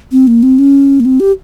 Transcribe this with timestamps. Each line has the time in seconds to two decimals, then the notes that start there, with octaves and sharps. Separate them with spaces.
0.12 C4
0.27 A#3
0.43 C4
0.59 C#4
1.00 A#3
1.05 C4
1.20 G4